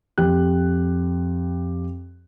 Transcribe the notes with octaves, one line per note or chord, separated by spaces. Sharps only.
F2 G4 F#6